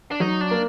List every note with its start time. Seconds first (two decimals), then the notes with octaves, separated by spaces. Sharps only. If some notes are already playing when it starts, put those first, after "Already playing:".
0.11 D4
0.20 F#3 D#4
0.41 D4
0.51 A#3